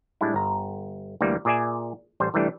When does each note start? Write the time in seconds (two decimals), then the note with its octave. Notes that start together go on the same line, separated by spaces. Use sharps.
0.21 A2 G3 G#3 D4 E4
0.34 G1 A#5
1.21 D2 E3 G3 A#3
1.45 A#2 G#4 D5 E5 G#5
2.20 A1 G3 C5
2.34 C2 E3 G3 A3 D4 G4